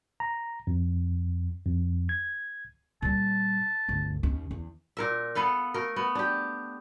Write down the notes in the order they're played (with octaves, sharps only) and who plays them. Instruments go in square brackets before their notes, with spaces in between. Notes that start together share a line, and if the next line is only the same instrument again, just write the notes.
[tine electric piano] A#5
F2
F2
G#6
[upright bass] A#2 G3 [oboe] A5
[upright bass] G1 D2
D#2 C#4
E2
[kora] A#2 A#4 E5
B3 A4 B4 F5
A3 A#4
B3
D4 G4